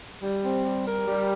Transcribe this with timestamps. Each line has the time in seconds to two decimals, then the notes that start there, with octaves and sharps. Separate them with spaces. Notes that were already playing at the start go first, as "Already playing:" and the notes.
0.22 G3
0.44 C4
0.65 G3
0.86 A#4
1.07 G3